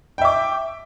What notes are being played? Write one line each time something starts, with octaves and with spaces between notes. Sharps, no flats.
E5 G5 D6